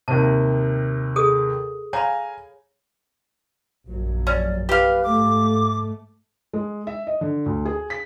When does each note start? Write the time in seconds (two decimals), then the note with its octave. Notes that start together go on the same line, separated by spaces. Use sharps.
0.08 D#2 C3 A5
1.16 G#4 A4 D#6
1.93 C#5 F5 G#5 A#5 B5
3.87 A#1 F#2 F#3
4.27 C#4 D5
4.69 G4 B4 F5
5.03 G#2 A3 D6
6.53 G#3
6.87 E5
7.07 D#5
7.21 D3
7.46 D2
7.65 G#4
7.90 B6